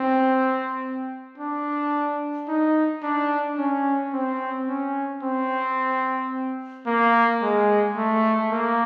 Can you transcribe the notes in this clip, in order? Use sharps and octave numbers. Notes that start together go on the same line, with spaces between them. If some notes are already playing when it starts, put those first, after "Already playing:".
Already playing: C4
D4
D#4
D4
C#4
C4
C#4
C4
A#3
G#3
A3
A#3